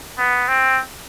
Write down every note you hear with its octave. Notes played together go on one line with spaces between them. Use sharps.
B3
C4